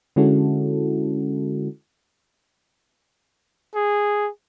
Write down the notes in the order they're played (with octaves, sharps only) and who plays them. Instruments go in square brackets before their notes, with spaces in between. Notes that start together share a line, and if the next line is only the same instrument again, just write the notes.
[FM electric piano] D3 G#3 C#4 E4 F#4 A4
[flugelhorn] G#4